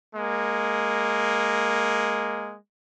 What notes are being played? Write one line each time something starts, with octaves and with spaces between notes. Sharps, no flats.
G#3 A#3